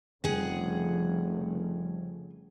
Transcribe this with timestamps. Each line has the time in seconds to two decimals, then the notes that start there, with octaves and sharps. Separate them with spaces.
0.24 F1 C#3 F3 G3 A3 G#4 F#5